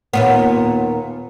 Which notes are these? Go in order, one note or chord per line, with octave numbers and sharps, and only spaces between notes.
D#2 A#2 B3